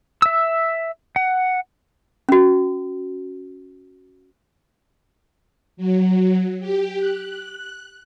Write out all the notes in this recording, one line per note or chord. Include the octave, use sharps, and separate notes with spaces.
E5 E6
F#5
C#4 F#4
F#3
G4
F#6